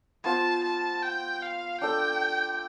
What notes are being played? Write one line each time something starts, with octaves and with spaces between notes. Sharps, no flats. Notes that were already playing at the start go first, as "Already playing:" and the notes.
B3 F4 C5 A5
A5
G5
F5
D4 A4 D5 G5